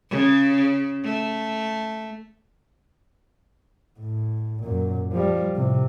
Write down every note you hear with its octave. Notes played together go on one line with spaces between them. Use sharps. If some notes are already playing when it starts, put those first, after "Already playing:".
C#3
A3
A2
F#2 A#2
F3 G3
A2 C3